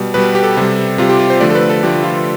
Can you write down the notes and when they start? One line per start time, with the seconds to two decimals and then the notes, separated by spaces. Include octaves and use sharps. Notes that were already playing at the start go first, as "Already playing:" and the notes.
Already playing: B2 G3
0.14 B2 G3 B4
0.35 G4
0.43 A4
0.57 C3 G3
0.98 C3 F4
1.02 G3
1.09 G4
1.19 F4
1.30 C5
1.40 D3 F3 A3 D5
1.50 A4
1.55 B4
1.69 A4
1.83 D3 F3 A3 G4
2.04 F4